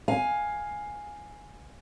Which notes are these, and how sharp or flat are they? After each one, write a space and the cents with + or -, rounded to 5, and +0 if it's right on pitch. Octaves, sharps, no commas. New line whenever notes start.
F5 +10 G#5 +0